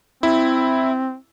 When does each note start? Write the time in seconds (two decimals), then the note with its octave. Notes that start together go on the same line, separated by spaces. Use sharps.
0.23 C4 E4